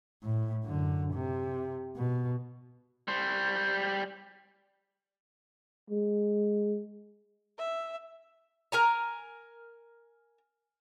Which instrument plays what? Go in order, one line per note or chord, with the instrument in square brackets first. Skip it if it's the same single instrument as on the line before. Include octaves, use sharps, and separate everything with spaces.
[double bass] A2
F#2 D3
C3
B2
[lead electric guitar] G3 C5
[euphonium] G#3
[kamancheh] E5
[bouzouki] A#4 G#5 A#5